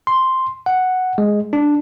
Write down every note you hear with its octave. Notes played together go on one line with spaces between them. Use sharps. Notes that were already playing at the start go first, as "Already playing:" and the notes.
C6
F#5
G#3
D4